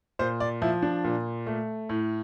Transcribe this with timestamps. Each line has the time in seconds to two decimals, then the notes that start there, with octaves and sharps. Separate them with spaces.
0.19 A#2 C5
0.40 D5
0.62 F3 E4
0.83 D4
1.04 A#2
1.47 A3
1.89 A2